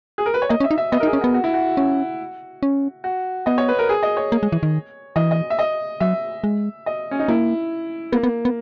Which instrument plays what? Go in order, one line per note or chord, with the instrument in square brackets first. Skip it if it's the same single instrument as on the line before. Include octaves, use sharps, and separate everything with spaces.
[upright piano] G#4
A#4
B4
C#5
[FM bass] A#3 [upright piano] D#5
[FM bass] C#4
[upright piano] E5
[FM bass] D#4
[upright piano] E5
[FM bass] B3 [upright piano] D#5
[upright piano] A#4
[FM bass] D#4
[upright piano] G#4
[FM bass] C#4
[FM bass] B3 [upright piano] F#4
[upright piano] F#4
E4
F#4
[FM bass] C#4
C#4
[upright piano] F#4
[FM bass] B3 [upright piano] D#5
[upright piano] C#5
B4
A#4
G#4
D#5
C#5
[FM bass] A#3
G#3
E3
D#3
[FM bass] E3 [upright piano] D#5
[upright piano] D#5
E5
D#5
[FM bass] F#3 [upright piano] E5
[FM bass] G#3
[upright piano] D#5
C#4
D#4
[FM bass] A#3 [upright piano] E4
[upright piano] A#3 [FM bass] B3
[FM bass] B3
B3